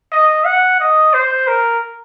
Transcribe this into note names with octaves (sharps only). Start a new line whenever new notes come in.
D#5
F#5
D#5
C5
A#4